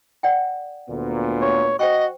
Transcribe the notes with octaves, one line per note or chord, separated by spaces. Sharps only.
D5 F#5 G5
D2 A#2 B3
C#5
F#4 C5 D#5 G5 C#6